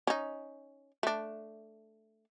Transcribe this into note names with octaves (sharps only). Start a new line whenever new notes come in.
C#4 D#4
A3 D4